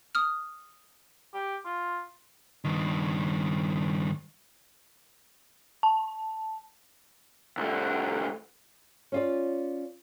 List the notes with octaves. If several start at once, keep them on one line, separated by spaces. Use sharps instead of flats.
D#6 F6
G4
F4
G2 D#3
A5
C2 A3
C#4 F4 D5